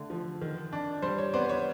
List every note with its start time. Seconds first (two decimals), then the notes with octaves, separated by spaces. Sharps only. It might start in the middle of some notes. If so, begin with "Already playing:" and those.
Already playing: D3 A3
0.10 F3
0.41 D#3
0.73 D4
1.02 G3 C5
1.18 C#5
1.34 B3 C5 D5
1.49 C#5